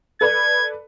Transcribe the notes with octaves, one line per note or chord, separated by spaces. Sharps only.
A4 B4 D5 G#6